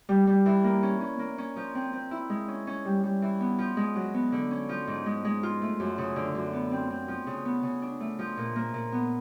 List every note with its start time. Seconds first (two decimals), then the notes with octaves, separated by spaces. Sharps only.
0.09 G3
0.27 G3
0.46 E3
0.64 A#3
0.83 C#4
1.01 C#4
1.19 A#3
1.38 C#4
1.56 F3
1.75 C4
1.93 C4
2.11 E4
2.30 G#3
2.48 C#4
2.67 C#4
2.85 G3
3.04 G3
3.22 E3
3.40 B3
3.59 F3
3.77 G#3
3.95 F#3
4.14 B3
4.32 D3
4.51 C#4
4.69 F3
4.88 G#2
5.06 G#3
5.25 G#3
5.43 F4
5.61 A3
5.80 F#2
5.98 C#3
6.16 D3
6.35 F#2
6.53 B3
6.71 C4
6.90 C4
7.08 F3
7.27 C#3
7.45 B3
7.63 C#3
7.82 D4
8.00 A3
8.19 F3
8.37 A#2
8.56 A#3
8.74 A#2
8.92 B3